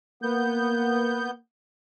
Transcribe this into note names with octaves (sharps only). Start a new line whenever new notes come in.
A#3 B3 G6